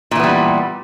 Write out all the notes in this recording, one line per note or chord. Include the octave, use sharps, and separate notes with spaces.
A#2 E3 G3 B3